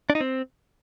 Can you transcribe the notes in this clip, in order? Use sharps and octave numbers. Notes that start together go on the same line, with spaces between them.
D4
D#4
C4